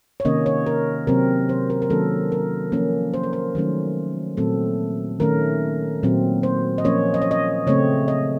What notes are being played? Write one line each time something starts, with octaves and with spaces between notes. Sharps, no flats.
C#5
C3 D#3 A#3 C#4 D#5
C#5
A#4
C3 F#3 C4 A#4
C5
A#4
A#4
D#3 F#3 A#3 C#4 A4
A#4
F3 A#3 C#4
C5
A#4
C5
D#3 F#3 A3 C#4
A#2 F#3 A3 C4 A4
D#3 A3 C#4 A#4
A#2 F#3 C4
C5
D#5
F3 A#3 C#4 C#5
D#5
C#5
D#5
C#3 A3 C4 C#5
D#5